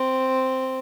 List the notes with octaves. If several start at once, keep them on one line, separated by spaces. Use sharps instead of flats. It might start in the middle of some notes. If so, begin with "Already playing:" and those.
Already playing: C4